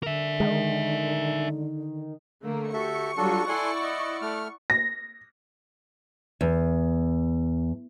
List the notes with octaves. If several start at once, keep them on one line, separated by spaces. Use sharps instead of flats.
D3 A#4 E5
D#3 G#3
D3 A3 A#3
F#4 G4 A4 E5 C#6
F#3 G3 D4 F4 F#4 A4
E4 A4 D5 F#5 G#5 C6
D#5
A3 F6
A#6
E2